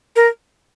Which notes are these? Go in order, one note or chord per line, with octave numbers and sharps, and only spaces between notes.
A#4